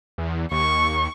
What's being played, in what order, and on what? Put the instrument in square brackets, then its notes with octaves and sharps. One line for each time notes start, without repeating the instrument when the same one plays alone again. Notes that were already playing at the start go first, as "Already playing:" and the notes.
[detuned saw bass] E2
[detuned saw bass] D#2 [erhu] C#6